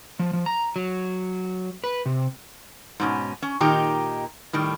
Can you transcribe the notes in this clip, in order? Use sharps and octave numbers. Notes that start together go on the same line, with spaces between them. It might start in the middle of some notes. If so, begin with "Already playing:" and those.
F3
F3
A#5
F#3
B4
C3
G#2 B2 C#4
C#4
A#2 D#3 D#4 G4 A#5
A2 D#3 G3